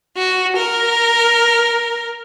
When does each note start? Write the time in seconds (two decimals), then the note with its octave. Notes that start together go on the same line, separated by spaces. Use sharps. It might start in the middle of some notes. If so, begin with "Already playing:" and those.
0.17 F#4
0.56 A#4